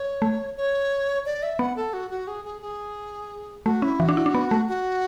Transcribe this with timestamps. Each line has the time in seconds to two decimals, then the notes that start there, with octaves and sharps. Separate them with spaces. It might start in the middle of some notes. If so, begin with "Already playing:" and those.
Already playing: C#5
0.22 A3
0.57 C#5
1.26 D5
1.43 E5
1.59 B3 F#5
1.76 A4
1.93 F#4
2.11 F#4
2.28 G#4
2.45 G#4
2.62 G#4
3.65 A3 F#4
3.82 C#4 E4
4.00 E3 F#4
4.09 D4
4.17 E4
4.26 D4
4.34 B3
4.51 A3
4.68 F#4